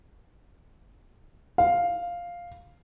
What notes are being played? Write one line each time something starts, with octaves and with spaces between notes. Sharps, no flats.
F5